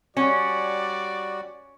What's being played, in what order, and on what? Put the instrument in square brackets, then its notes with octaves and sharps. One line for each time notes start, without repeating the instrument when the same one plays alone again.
[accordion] G3 F#4 [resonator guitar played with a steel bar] C#4 [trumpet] D5